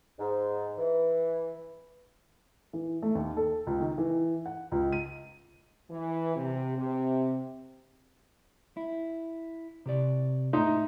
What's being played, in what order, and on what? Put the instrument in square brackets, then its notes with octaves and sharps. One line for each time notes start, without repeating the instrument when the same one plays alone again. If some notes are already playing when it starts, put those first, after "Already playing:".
[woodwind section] G#2
E3
[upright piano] E3
A3
D#2
A4
C#2
D#3
E3
F#5
C#2
D#7
[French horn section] E3
C3
C3
[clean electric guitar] E4
C3 G4 D5
[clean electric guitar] A2 E5 C6 [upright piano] D#4